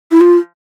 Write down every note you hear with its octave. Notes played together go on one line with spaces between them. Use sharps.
E4
F4